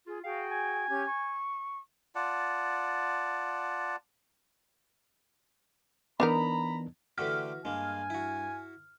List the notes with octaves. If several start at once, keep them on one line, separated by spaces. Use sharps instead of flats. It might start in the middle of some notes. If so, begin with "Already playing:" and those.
F4 G#4
F#4 G#4 F5 G5
G#5
C#4 G4 G#6
C#6
F4 D5 F#5 A5
E3 B3 D4 D#4 A#4 A#5 B5
D3 E3 A3 F#4 G4 F6
G2 G#3 A#3 G#5
E4 F#4